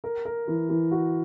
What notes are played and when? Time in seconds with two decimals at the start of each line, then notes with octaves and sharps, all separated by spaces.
0.04 A#4
0.25 A#4
0.48 E3
0.69 E3
0.91 F#4